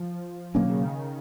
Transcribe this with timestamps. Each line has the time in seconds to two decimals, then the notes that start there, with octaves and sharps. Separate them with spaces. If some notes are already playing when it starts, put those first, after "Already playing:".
Already playing: F3
0.54 B2 D#3 F#3 A#3 C#4
0.69 C#3